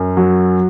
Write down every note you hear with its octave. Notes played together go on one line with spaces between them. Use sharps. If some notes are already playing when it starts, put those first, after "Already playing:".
Already playing: F#2
F#3